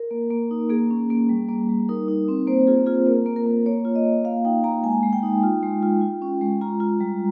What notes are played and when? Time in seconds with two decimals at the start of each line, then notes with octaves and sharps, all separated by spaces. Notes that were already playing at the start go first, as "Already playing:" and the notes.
Already playing: A#4
0.11 A#3
0.31 A#3
0.51 D#4
0.70 A#3 G#4
0.91 C#4
1.10 A#3
1.29 G3
1.49 A#3
1.69 G3
1.89 D#4 A#4
2.08 D#4
2.28 C4
2.47 A#3 C5
2.67 F4 G#4
2.86 F4 G#4
3.07 A#3 A#4
3.26 A#3
3.36 A#4
3.46 A#3
3.66 A#3 C#5
3.85 F4
3.95 D#5
4.05 A#3
4.25 A#3 F5
4.45 D#4 G5
4.64 A#3 A#5
4.83 G#3 G#5
5.03 G#3
5.13 G5
5.23 D#4
5.44 F4
5.63 G#3
5.83 F4
6.01 F4
6.22 C#4
6.41 G#3
6.61 F4 A#5
6.80 F4
7.00 G3